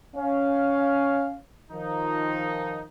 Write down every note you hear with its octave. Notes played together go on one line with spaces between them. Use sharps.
C#4 F5
D#3 F3 D#4